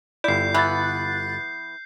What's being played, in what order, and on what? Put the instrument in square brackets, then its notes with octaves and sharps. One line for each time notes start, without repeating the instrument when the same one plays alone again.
[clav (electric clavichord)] G1 E4 [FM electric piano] D5 [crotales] G6 C7
[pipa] E3 B3 [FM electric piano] F#6 A6